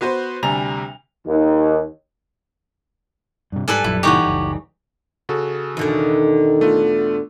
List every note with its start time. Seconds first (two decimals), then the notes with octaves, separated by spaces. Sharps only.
0.01 B3 F#4 B4 C5
0.43 D2 C3 G3 G#5 A#5 F7
1.26 D#2
3.52 G2 C3
3.68 G#2 G3 A4 B4 G#5
3.84 A#1 F#2 E4
4.03 G1 A#2 C#3 E3 D#4 G4 C#5 F#5
4.25 F#1 C#2
5.29 C#3 F#4 A4
5.77 E2 B2 D3 D#3
6.61 A3 B3 F4